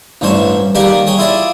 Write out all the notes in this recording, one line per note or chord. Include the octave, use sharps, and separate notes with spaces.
A1 G2 E3 C5 C#5
D#3 G3 A#3 G4 G#4 D5
G#4 C#5 G5
E4 F4 G#4 D5 A5